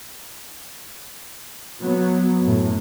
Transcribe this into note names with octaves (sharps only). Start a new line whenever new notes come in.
F#3 B3
F#2 A2